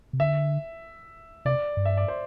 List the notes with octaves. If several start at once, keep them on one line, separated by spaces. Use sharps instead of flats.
C3
D3 E5
C3 D5
G2
E5
D5
C5